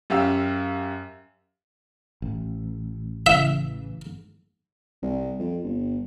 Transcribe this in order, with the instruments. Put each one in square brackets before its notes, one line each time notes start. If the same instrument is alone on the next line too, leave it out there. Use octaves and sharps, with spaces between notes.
[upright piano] F#2 G4 F5 E6
[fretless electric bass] A1
[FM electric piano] C#3 E3 [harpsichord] E5
[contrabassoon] C2
F2
G1